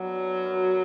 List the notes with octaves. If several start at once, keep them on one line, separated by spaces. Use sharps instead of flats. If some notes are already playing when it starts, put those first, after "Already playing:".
Already playing: F#3 B3 D4
E3
F#2